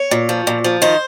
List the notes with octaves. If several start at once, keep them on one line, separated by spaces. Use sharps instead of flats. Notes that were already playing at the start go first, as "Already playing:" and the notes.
Already playing: C#5
A#2
F3
A#2
F3
D#3 C5